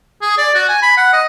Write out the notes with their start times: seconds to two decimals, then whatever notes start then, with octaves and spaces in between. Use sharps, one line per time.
0.22 G#4
0.38 D5
0.55 F#4
0.69 G#5
0.82 B5
0.97 F#5
1.13 D#5